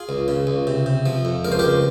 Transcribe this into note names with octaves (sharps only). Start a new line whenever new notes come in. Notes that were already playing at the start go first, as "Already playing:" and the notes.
Already playing: F4 G#4
C#2
C#3
C#2
C3
C3
F3
F2
C#2 A#4
C5
C#2 G4 A#4